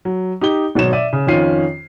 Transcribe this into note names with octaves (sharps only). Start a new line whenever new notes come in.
F#3
D#4 G4 G7
G#1 B2 F#3 C#5 E7
D5 E5 D#7
C#3
F2 D#3 C#4 F4 C7 D#7